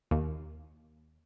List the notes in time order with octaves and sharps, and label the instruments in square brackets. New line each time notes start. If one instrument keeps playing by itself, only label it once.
[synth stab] D#2